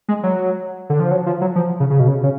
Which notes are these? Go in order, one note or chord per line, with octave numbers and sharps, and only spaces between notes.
G#3
F#3
D3
F3
F#3
F3
F#3
F3
C#3
C#3
B2
C#3
C#3